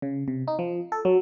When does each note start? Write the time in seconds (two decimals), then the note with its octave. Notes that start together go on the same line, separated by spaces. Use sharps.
0.02 C#3
0.28 C3
0.48 D#4
0.59 F3
0.92 A4
1.05 F#3